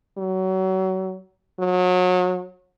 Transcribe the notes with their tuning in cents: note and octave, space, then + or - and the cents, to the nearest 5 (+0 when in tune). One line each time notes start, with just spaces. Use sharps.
F#3 +30
F#3 -30